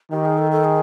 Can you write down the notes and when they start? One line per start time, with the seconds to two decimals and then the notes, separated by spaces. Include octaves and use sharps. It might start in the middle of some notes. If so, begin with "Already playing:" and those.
0.11 D#3 G4
0.25 G#4
0.38 A4
0.51 A4
0.64 G#4